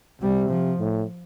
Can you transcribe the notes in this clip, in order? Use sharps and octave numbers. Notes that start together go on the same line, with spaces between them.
C3 G3
F3
A2